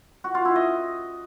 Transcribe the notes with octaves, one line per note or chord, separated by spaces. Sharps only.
F#4
F4
E4
D#5